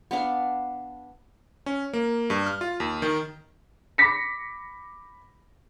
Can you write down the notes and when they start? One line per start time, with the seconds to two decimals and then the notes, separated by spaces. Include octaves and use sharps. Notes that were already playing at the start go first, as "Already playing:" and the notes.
0.11 B3 D4 F5
1.66 C#4
1.93 A#3
2.30 G2
2.46 F6
2.61 F4
2.80 D#2
3.02 D#3
3.98 B5 D6 A#6 B6 C#7